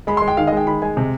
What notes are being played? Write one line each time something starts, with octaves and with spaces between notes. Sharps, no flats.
G#3 B5
C6
G#3
G5
D#3 F5
D#5
G#3 G5
D#3 B5
G#3 G#5
C3